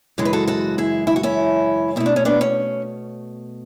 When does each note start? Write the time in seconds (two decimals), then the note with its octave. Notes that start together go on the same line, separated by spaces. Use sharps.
0.18 F#2 C#3 E3 G#3 A4
0.25 B4
0.33 F#4 A4
0.48 F#4 A4
0.78 E4 G#4
1.07 E4
1.16 F#4
1.23 C#4 E4
1.96 B2 A3 E4
2.06 D4
2.16 C#4
2.25 B3 D4
2.41 C#4